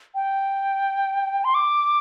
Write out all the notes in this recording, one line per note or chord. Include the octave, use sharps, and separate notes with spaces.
G5
C6
D6